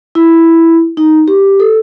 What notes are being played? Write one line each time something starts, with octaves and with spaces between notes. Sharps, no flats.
E4
D#4
G4
A4